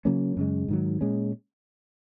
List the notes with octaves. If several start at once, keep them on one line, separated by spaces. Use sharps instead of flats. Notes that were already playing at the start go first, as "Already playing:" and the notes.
C#3 F#3 A#3 C#4
F#2 C#3 G#3
G#2 D#3 F#3
A#2 G#3 C#4